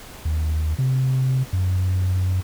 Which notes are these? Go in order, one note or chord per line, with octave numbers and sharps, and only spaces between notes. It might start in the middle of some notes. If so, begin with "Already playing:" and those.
D#2
C3
F#2